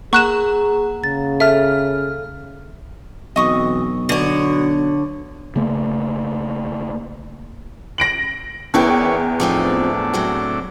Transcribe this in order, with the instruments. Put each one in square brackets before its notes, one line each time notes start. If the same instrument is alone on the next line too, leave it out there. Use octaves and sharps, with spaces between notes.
[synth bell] A#3 F#5 A#5 [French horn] G#4 [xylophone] C#6 F#6 E7
[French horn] C#3 [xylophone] A6
[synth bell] A4 F6 [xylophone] E5
[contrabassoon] B1 [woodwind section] E3 C4 F#4 [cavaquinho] D#5 C#6 D#6
[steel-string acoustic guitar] D3 C#5 [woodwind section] B3 F#4
[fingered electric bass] C#3 A3 A#3
[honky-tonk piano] A#6 D7 F#7
[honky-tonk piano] E2 B3 G5 [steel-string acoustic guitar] A#3 E4 D5 [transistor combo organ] C#4 C#5
[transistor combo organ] A2 D4 [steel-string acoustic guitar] F3 C4 D#4
[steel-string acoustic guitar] F#3 C4 F#4